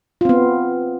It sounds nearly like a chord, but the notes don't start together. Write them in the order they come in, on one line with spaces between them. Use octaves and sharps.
F4 C4 B3